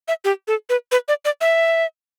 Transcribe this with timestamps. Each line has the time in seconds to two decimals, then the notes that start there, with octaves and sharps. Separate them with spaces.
0.08 E5
0.25 G4
0.48 A4
0.69 B4
0.92 B4
1.08 D5
1.25 D5
1.41 E5